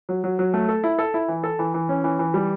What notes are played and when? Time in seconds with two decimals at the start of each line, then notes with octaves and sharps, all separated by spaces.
0.09 F#3
0.24 F#3
0.39 F#3
0.54 A3
0.69 A4
0.84 E4
0.99 A4
1.14 E4
1.28 E3
1.44 A4
1.59 E3
1.74 E3
1.89 C#4
2.04 E3
2.19 E3
2.34 G3